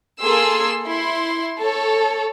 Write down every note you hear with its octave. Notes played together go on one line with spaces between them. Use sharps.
A#3 G#4 A4 C6 E6
E4 C6
A4 C#5